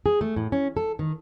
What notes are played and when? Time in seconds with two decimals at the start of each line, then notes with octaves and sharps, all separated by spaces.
0.06 G#4
0.21 A3
0.36 A2
0.52 C#4
0.77 A4
0.99 D#3